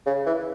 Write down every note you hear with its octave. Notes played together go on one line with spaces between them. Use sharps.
C#3
E3